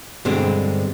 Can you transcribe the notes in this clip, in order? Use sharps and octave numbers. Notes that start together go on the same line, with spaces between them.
G2 B2 D3 G#3 C4 D4